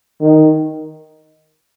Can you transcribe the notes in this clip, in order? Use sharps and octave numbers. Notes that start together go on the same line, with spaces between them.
D#3